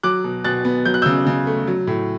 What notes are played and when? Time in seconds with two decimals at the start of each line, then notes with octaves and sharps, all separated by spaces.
0.03 F#3 D6 F#6
0.24 B2
0.44 B2 F#6 A6
0.65 B3
0.85 F#3 G6
0.94 F#6
1.02 C#3 E6 G6
1.26 C#3
1.47 A3
1.67 F#3
1.87 A2